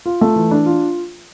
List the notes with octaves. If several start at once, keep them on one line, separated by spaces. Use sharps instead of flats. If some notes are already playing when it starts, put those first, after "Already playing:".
F4
A3
E3
D4
F4